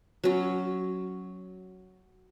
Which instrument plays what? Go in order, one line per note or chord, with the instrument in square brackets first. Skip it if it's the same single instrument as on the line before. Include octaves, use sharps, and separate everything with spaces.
[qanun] F#3 C#4